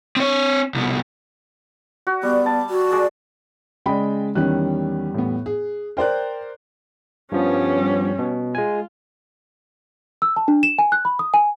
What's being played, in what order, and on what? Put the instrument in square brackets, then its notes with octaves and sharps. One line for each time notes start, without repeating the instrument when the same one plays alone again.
[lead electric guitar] C4 C#5
C2 B2
[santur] F#4
[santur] G3 [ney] B3
[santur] A5
[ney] F#4
[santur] G#3 D5
[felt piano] C#3 G#3 B5 [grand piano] D5 D#5 G5
[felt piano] E2 G3 F#6 [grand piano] D#3 C#4
[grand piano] A2 B3
G#4
[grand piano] A#4 C5 D5 [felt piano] G5 F#6
[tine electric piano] G2 F3 B3 [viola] G3 C#4
[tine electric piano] B2
[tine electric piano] G#3 G#5 [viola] F4
[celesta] E6
A5
D4
E7
G#5
F#6
B5
D#6
G#5